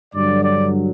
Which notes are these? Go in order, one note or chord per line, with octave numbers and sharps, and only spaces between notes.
G2 D3 F#3 D5
D5